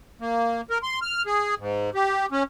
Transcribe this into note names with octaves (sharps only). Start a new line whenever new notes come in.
A#3
A#4
C6
F6
G#4
G#2
G4
C#4